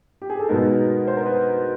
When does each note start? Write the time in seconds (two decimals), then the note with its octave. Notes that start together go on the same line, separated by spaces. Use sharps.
0.22 G4
0.30 G#4
0.39 A4
0.49 B2 G#3 B3 D#4 A#4
1.08 C5
1.17 A#4
1.26 B4